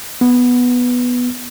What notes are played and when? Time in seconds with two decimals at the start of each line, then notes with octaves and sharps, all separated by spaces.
0.21 B3